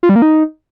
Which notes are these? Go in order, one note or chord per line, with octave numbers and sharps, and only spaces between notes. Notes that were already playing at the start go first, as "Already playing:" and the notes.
F4
G3
A#3
D#4